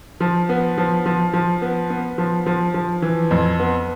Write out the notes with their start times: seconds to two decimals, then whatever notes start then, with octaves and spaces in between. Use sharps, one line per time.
0.20 F3
0.49 B3
0.78 F3
1.06 F3
1.33 F3
1.62 B3
1.90 B3
2.18 F3
2.46 F3
2.74 F3
3.02 E3
3.31 F2
3.59 B3